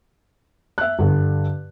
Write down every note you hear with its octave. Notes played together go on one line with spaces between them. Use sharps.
E5 F#6
G2 D3